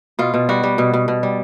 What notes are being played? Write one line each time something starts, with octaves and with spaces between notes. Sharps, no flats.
B2 F4
B2
G3 F#4
G3
B2
B2
B2
G3